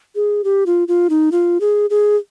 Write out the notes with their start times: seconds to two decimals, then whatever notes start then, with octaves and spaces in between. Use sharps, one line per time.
0.15 G#4
0.44 G4
0.66 F4
0.88 F4
1.10 D#4
1.32 F4
1.61 G#4
1.90 G#4